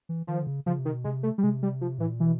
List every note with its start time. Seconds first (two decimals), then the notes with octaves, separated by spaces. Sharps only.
0.09 E3
0.27 D#3 F3
0.41 D3
0.47 C#3
0.66 C#3 F3
0.79 C3
0.85 D#3
0.92 B2
1.04 C3 G#3
1.23 A3
1.38 G3
1.43 C3 G#3
1.63 G3
1.81 F3
1.98 A2 E3
2.09 A#2
2.19 B2 E3